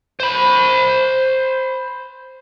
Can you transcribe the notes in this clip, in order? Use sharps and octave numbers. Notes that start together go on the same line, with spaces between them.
C5 B5